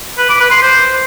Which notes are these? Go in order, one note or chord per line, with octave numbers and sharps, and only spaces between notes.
B4
D6
B4
C6
C5